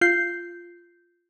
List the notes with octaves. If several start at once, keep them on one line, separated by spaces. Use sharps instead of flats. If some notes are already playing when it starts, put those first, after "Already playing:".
F4 G6 C7